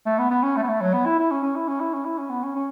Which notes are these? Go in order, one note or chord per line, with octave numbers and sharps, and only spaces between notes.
A3
B3
B3
C#4
A3
B3
A3
F#3
B3
E4
E4
C#4
C#4
E4
C#4
E4
C#4
E4
C#4
B3
C#4
C#4